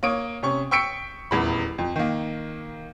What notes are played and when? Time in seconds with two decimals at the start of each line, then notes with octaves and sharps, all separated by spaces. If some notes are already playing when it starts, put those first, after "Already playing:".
0.03 A#3 C#5 D#6 D7
0.43 C3 C#4 C#6
0.71 G5 C#6 E6 B6 C#7 D7
1.31 D#1 E2 B5
1.78 F2
1.96 D#3 A#3